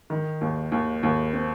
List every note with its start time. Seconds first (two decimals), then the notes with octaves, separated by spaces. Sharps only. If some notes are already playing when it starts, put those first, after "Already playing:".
0.10 D#3
0.41 D#2
0.72 D#2
1.03 D#2
1.33 C4